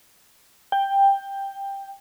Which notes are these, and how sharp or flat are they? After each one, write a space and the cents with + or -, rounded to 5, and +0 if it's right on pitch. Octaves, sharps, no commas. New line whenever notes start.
G5 +10